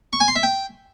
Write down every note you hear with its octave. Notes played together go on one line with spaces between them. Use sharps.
C#6
G#5
C6
E5
G5